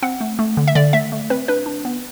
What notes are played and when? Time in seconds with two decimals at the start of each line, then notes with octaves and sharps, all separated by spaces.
0.02 C4 F#5
0.21 A3
0.39 A3
0.57 D3
0.68 E5
0.75 D3 D5
0.93 A3 E5
1.12 A3
1.30 C4 B4
1.48 D4 B4
1.66 D4
1.85 B3